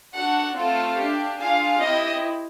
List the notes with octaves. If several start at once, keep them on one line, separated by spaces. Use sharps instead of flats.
D4 F#4 A4 F#5
A3 C4 F4 A4 F5
D4 G4
D4 F4 G#4 F5
C4 E4 G4 D#5